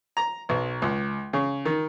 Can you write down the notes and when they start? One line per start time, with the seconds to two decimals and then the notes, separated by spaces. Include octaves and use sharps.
0.17 A#5
0.49 B1
0.82 C#2
1.33 C#3
1.65 D#3